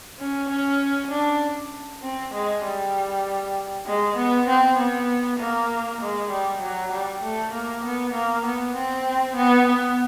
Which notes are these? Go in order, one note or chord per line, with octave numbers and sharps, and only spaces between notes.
C#4
C#4
D4
C4
G#3
G3
G#3
B3
C4
B3
A#3
G#3
G3
F#3
G3
A3
A#3
B3
A#3
B3
C4
B3
B3